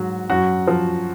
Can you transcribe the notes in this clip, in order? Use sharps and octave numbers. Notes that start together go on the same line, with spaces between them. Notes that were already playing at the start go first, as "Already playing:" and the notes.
Already playing: G#2 F#3 F#4
F#2 F#4
F3